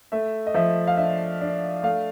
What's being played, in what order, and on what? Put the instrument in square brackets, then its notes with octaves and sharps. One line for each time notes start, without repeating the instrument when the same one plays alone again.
[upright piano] A3 E5
D#5
F3 E5
F5
D4 E5
D4
A3 F5